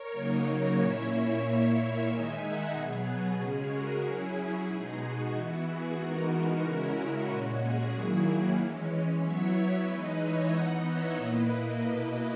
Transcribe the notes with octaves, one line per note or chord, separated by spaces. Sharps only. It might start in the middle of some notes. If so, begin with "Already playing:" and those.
Already playing: A#4 C#5
C#3 F#3 A#3 D#4
A#2 A#3 C#4 E4 C#5 E5
A#2 A#3 E4 C#5 E5
D#3 G#3 D#4 E5 G#5
D#5 F#5
B2 F#3 B3 G#4
C#3 G#3 C#4 G#4
F#4 A#4
F#3 C#4 E4 G#4
B2 G#3 D#4
F#4
E3 B3 E4
G#4
E3 G#3 B3 D#4 F#4 A#4
C#3 G#3 C#4 E4 F#4 A#4
F#4
A#2 G#3 C#4 F#4
G#4
D#3 F#3 A#3 E4 G#4
E3 G#3 C#4
F#3 B3 E4 C#5 E5
C#5 E5
E3 G#3 D#4 B4 D#5
C#5 E5
E3 B3 D#4 D#5 F#5
C#5 E5
A#2 A#3 E4 B4 D#5
B2 A#3 E4